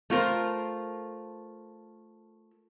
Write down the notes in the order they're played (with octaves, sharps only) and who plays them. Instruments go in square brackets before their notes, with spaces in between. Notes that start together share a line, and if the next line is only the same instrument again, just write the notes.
[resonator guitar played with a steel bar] A3 F4 A#4 C5